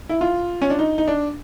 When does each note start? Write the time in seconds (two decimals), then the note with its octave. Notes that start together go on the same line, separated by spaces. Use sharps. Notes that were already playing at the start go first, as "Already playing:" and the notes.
0.09 E4
0.21 F4
0.62 C#4
0.70 D4
0.79 D#4
0.98 D#4
1.08 D4